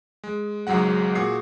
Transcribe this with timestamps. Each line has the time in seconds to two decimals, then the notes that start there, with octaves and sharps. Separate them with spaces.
0.24 G#3
0.67 G#1 C#2 G#2 F#3 G#3 F#5
1.15 A#2 F#4 G#4 C7